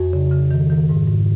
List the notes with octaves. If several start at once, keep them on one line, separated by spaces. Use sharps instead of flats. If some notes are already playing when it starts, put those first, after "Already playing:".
Already playing: F2 F#4
C#3
C#3
D#3
D#3
G#2
G#2